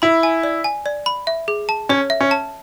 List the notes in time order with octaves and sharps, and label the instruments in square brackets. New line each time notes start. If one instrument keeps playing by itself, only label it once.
[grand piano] E4 [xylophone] B5
[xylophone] G#5
D5
G#5
D5
B5
E5
G#4
A5
[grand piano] C#4 [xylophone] C#5
[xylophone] E5
[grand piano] C#4
[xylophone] A5